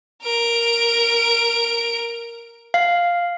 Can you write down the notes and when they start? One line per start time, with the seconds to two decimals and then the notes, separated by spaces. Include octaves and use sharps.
0.23 A#4 D7
2.74 F5